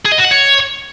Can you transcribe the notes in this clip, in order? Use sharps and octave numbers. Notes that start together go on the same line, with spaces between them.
G#4
D#5
F#4
F#5
C#5